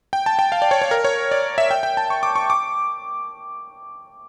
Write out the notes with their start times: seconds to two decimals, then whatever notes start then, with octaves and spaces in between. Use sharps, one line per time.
0.13 G5
0.26 A5
0.39 G5
0.52 F5
0.62 D5
0.71 C#5
0.82 C#5
0.91 A#4
1.04 C#5
1.31 D5
1.58 E5
1.71 G5
1.83 G5
1.97 A5
2.10 C#6
2.23 D6
2.36 C#6
2.50 D6